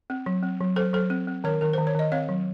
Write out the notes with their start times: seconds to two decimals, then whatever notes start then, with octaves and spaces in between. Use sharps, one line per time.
0.10 C4
0.26 F#3
0.43 C4
0.61 F#3
0.76 F#3 A4 C5
0.93 F#3 A4 C5
1.10 C4
1.27 C4
1.44 D#3 A#4 C#5
1.61 D#3 A#4
1.73 D#3 C5
1.87 C#5
1.95 D#3 D#5
2.12 C4 C#5 F5
2.29 F#3